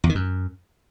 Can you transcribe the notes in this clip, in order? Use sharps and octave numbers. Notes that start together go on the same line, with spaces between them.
E2
D#3
F#2